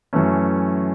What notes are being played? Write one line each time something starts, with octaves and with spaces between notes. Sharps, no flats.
F#2 E3 A3 C#4